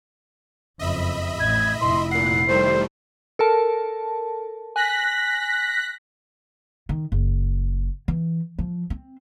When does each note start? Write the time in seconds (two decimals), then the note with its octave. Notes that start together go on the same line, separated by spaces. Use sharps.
0.79 F#1 F2 D#5 E5 B5
1.39 A1 G#6
1.80 F1 E4 C6
2.11 A#2 F#5 C7
2.48 D#3 G3 A3 C5
3.39 A4 A#4 A5
4.76 G#5 F#6 A#6 B6
6.89 D#3
7.12 F#1
8.08 E3
8.59 F3
8.90 C4